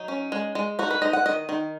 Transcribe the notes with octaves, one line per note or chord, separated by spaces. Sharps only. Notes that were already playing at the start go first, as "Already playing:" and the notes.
Already playing: F#3 D#4
C#4
G#3
G#3
D#4 F#4
B4
D#4 D#5
F#5
D#3 D#5
D#3